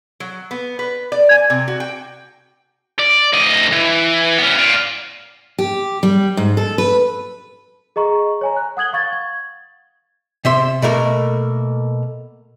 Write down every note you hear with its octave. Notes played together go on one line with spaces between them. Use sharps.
F#3
B3
B4
D5
G#5
C3
F#4
G5
D5
D2 D#5
E3
B3 C#4
D5 F5
G4
G3
G#2
A4
B4
G#4 D#5 A#5 C#6
C#5 G#5 A#5
F#6
F#5 D#6 G#6 F#7 G7
F5 C#6 G#6 A6
G#6
C3 E5 C6
B2 A3 A#3 A#4